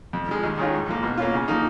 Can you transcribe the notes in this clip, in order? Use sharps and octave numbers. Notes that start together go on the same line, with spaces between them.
F2
F3 G#3
D#2
D#3 G#3 C#4 F4
G#2
F3 A#3
B2
A#3 C#4 F4
C#3
F3 A#3 D#4